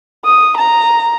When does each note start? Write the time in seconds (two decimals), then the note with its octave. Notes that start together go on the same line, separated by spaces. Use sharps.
0.25 D#6
0.57 A#5